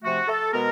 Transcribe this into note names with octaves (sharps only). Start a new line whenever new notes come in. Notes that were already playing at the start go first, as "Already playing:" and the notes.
C3 F3 A3 F#4
A4
B2 G#3 B3 A#4